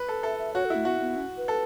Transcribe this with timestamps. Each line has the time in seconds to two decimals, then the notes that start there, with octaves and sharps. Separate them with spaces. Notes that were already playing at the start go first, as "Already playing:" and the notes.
Already playing: B4
0.08 A4
0.23 A4 E5
0.39 E5
0.54 F#4 C#5
0.65 A4
0.70 A3 E4
0.85 B3 F#4
1.01 B3
1.16 C#4
1.37 B4
1.48 A4